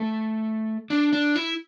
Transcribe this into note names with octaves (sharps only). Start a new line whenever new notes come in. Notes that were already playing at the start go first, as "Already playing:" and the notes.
Already playing: A3
D4
D4
E4